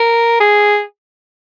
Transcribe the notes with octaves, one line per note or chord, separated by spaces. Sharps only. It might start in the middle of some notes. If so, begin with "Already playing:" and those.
Already playing: A#4
G#4